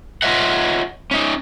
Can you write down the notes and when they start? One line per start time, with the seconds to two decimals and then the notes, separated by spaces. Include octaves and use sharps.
0.22 F4 C#5 D#5 E5 F#5
1.11 C#4 D#4